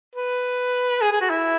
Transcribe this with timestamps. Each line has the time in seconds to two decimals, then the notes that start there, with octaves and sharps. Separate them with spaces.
0.15 B4
1.02 G#4
1.12 G#4
1.21 F#4
1.30 E4